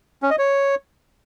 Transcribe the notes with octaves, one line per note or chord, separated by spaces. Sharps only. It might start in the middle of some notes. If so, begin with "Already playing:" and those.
C#4
D#5
C#5